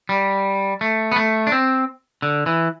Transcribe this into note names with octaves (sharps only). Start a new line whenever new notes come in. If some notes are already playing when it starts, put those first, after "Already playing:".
G3
A3
B3
A3
D4
C4
D3
E3